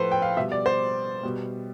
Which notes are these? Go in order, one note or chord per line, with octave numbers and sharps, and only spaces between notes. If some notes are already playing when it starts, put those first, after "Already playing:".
Already playing: A2 F3 A4 B4 C5
G5
F5
B2 G3 E5
D5
C5
B2 G3